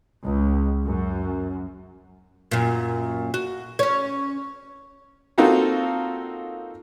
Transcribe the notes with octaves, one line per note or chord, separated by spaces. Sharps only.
C#2
F#2
F#2 A#2
F#4
C#4 C#5
A#3 C4 D#4 F4 F#4 A4